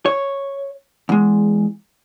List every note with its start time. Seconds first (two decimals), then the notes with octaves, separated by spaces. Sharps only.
0.06 C#5
1.09 E2 G#3